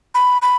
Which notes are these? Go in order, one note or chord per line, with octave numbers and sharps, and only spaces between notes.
B5
B5